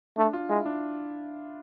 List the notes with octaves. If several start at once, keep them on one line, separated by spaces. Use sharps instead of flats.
A3 D4
F4
G#3 E4
D4